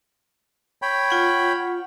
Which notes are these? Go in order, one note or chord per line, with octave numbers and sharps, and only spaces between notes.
C#5 G5 B5
F4 F#5